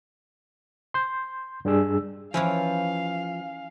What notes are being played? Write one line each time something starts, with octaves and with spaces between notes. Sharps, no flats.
C6 G6
G2 G3 D4 G#4 E6
E3 F3 C#4 E4 F5 G#5